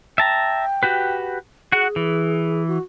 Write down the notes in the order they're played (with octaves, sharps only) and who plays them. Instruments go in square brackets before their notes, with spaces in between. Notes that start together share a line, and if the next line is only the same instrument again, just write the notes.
[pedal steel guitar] E5 A5 A#5 [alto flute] G5
[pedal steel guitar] F#4 G4 B4
[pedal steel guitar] F#4 F#5 [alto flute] G#4
[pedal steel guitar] E3
[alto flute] F#4